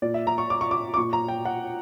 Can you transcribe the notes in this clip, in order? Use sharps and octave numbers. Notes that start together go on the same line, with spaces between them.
A#2 D5
E5
A#5
C#6
D6
C#6
D6
D6
A#2 C#6
A#5
G5
F#5